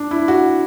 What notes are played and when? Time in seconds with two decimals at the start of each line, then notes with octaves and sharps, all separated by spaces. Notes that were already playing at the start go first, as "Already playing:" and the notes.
Already playing: D4
0.11 E4
0.28 F#4